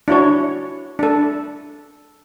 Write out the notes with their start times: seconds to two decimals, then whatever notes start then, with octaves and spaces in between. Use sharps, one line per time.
0.08 D4 E4 F#4 C#5
0.99 D4 A4